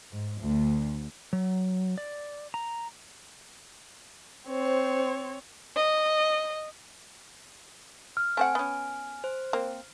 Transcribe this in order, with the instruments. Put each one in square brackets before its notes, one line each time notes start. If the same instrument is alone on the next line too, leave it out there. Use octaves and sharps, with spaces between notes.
[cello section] G#2
D2
[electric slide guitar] F#3
D5
A#5
[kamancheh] C4 C#5 [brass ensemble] C5
[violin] D#5
[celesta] F6
[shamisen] A3 C4 F#5 [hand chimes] G#5
[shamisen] B3 C#4
[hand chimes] C5
[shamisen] A#3 C4